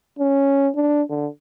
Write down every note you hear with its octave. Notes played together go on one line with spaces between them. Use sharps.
C#4
D4
D3